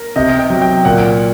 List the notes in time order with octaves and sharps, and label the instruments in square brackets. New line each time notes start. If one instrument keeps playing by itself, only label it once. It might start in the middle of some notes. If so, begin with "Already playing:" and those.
Already playing: [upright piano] A#4
[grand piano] C3 [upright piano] D#5
[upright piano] G5
[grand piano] F#3
[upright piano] G5
[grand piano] A#2 [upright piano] F#5